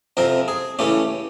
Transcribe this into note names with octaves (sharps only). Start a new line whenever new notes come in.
F2 C3 F3 A#4
G#4
C#3 E3 A3 C#4 G4